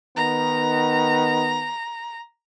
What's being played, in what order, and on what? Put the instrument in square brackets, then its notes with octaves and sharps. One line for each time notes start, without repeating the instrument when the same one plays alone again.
[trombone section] D#3 B3 [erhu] A#5